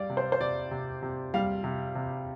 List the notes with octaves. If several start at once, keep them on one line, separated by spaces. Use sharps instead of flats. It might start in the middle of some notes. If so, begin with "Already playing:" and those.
Already playing: G3 D5 F5
C3
C5
C5
C3 D5
C3
C3
G3 F5
C3
C3